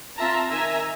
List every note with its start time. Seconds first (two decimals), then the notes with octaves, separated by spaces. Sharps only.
0.17 C4 F4 E5 A5 A#5
0.50 D#3 E5 G#5 A#5